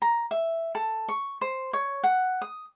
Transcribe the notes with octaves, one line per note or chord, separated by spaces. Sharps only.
A#5
E5
A4
C#6
C5
C#5
F#5
D#6